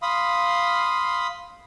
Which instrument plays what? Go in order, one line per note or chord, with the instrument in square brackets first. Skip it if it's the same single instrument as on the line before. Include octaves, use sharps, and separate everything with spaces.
[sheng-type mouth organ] F5 B5 C6 D#6